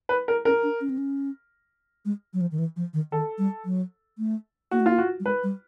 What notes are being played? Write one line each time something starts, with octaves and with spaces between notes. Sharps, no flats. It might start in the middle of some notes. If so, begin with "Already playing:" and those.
B4
A#4
C#4 A#4
D4
C#4
C4
C#4
G#3
F#3
F3
D#3
E3
F3
D#3
D#3 A4
G3
F#3
A3
A#3 F#4
A3
A#3 F4
F#4
G3
G#3 B4
G3